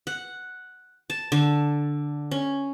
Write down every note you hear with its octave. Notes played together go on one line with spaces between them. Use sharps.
F#5
A5
D3
C#4